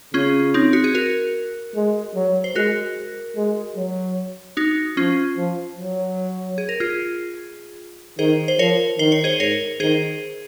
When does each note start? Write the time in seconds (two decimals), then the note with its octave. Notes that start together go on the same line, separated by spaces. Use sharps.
0.14 C#3 C#4 F4
0.54 C4 D#4
0.73 F#4
0.84 G#4
0.95 F#4 A#4
1.75 G#3
2.15 F#3
2.44 C5
2.55 G#3 F#4 A#4
3.36 G#3
3.77 F#3
4.57 D#4 F#4
4.97 F3 C#4 F4
5.37 F3
5.78 F#3
6.58 G#4
6.69 A#4
6.80 F4 G#4
8.19 D#3 G#4 C5
8.48 C5
8.59 F3 A#4 C#5
8.99 D#3 C5
9.12 C#5
9.24 G#4 C5
9.40 G#2 A#4 C#5
9.80 D#3 G#4 C5